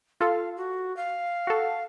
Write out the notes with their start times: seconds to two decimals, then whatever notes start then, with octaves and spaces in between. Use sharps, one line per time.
0.21 F4 A4 F5
0.57 F#4
0.97 F5
1.47 F#4 A4